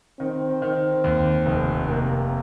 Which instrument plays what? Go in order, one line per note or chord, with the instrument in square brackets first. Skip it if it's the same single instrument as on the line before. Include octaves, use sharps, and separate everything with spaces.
[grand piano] D#3 [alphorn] C4
[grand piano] D#3
D#2
F1
[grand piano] C3 [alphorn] A#3